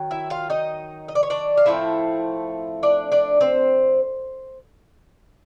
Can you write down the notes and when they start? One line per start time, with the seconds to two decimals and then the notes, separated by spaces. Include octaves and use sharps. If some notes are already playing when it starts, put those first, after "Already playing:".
Already playing: D#3 F#3
0.11 E4 E5
0.30 F4 F5
0.50 D#4 D#5
1.08 D#5
1.15 D5
1.23 C#5
1.30 D4 D5
1.57 F5
1.66 A2 F3 A3 C4 E4 E5
2.83 D4 D5
3.12 D4 D5
3.41 C4 C5